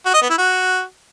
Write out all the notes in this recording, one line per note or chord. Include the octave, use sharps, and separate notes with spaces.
F#4
D#5
B3
E4
F#4